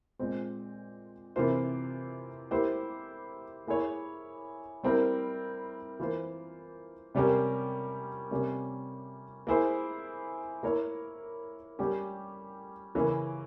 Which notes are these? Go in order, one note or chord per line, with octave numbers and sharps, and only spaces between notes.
A#2 G#3 C4
C3 E3 A#3 F4 C5
A#3 E4 G4 C5
A#3 E4 G#4 C#5
G3 C4 E4 A#4
E3 A#3 F4 C5
C3 G3 C#4 G4 A#4
C3 G3 A#3 C#4
A#3 E4 G#4 C5
A#3 E4 A#4 C#5
G3 A#3 C#4 G4
C#3 E3 A#3 C#4